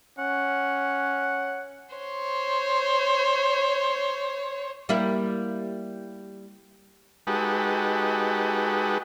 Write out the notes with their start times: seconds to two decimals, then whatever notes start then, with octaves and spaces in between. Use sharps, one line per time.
0.19 C#4 F#5
1.95 C5 C#5
4.89 G3 A#3 E4
7.27 G#3 D#4 F#4 G4 A4 B4